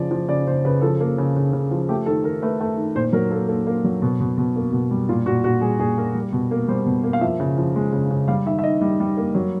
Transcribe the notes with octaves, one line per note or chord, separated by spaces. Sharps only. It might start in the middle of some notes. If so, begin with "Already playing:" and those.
Already playing: C#3 F3 D5
F3
C#3 D5
C#3 C5
C#3 B4
F3 A4
A#3
C#3
C#3
C#3
F3
A3 G4
D#3 A4
D#3 A#4
A3 B4
A3
D#3
A#2 C5
F#3 A#4
A#3 A4
A#3 A4
A#3
F#3
B2
B2
B2
A#3
B2
G3
A#2 F4
A#2 F#4
A#2 F#4
G3 G#4
A#2 G#4
A#3 A#4
G3
B2
A#3
G3 C5
B2
A#3
F5
F3 E5
C#3
F3
G#3
C#3
C#3
G3 F5
D#3 E5
E5
D#3 D#5
G3
G3
A#3
F#3